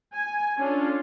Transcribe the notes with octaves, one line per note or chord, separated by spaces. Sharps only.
G#5
C#4 D4 F4 A4